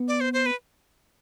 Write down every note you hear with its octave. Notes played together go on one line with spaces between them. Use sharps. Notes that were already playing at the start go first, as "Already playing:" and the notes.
Already playing: B3
D5
C5
C5
B4